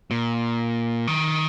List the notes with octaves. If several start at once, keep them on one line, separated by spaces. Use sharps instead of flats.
A#2
D#3